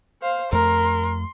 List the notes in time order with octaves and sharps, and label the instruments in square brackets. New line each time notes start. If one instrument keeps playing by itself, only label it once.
[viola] C5 F5
[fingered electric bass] F2 A3 [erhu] A#4 [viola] C6